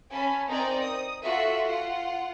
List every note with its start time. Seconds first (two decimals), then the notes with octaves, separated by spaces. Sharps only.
0.12 C#4 G#5 A5 B5
0.48 C4 D#4 A#4 D5
0.82 D#6
1.24 F4 F#4 A4 E5
1.65 F4 F#5